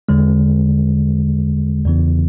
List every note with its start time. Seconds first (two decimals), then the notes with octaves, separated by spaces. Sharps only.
0.09 E2 D3 G#3
1.85 E2 C#3 E3 B3